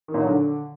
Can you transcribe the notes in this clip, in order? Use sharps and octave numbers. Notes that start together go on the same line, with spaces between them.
D#3
A#2
F#3
D3